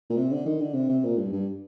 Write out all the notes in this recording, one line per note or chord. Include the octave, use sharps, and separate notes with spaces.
A#2
C3
D3
D#3
D3
C3
C3
A#2
G2
G2